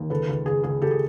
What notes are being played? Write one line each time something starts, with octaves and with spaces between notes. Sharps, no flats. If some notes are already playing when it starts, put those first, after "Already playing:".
Already playing: D#2
C#2 A4 B4
C#2
C#2 G#4
C#2 G#4
C#2 G4 A4
G#4